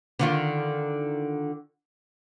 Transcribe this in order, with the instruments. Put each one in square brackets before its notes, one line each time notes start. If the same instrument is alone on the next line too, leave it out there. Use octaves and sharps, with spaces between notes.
[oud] D3 D#3 F4